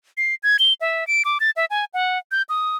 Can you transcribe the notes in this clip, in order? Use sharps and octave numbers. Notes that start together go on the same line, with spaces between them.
C7
G#6
G7
E5
D7
D6
A6
E5
G#5
F#5
G6
D#6